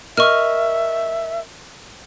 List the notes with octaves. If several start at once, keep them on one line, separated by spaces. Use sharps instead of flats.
A#4 D#5 E5 C#6 F6